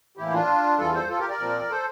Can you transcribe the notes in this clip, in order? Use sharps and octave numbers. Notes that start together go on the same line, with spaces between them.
A2 E3 A#3 E4 G4
D4 F4
E2 E3 G3 F4 A4
A4 C5
F4 A4
G4 A#4
A#4 D5
A#2 F3 C4
A4 C5